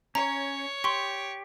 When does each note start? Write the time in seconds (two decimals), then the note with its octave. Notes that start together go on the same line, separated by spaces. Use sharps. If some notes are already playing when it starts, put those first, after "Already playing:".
0.15 C#4 C#5 A#5
0.84 G4 C6 C#6